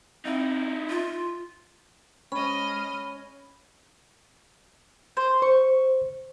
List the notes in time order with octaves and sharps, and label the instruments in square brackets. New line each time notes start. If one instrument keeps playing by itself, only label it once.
[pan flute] C4 [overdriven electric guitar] D#4 E4
[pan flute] F4
[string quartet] G#3 D#5 F6 [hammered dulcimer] C#4 [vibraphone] B5
[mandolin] C5
[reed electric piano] C5 [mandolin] C#6